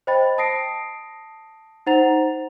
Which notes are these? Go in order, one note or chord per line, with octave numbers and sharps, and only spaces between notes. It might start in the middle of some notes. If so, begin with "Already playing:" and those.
C5 D#5 G5 B5 A6
A5 D#6 A#6 C7 D7
D#4 C5 F#5 A#5 A6 F7